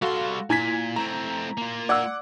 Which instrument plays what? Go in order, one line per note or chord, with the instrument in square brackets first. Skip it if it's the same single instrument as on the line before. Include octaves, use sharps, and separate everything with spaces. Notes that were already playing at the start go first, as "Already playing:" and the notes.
[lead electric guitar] G3 C6 [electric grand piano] F#4 A4 F5
[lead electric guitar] A#2 [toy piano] E4 [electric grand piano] G#5 G#6 B6
[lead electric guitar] A3 C4 [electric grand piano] A#5
[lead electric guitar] A#3 F4
[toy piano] D5 E6 [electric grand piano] F#5 D6